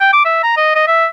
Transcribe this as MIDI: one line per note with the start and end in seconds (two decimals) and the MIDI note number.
0.01 0.12 79
0.13 0.24 86
0.25 0.39 76
0.43 0.56 82
0.57 0.74 75
0.76 0.87 75
0.88 1.06 76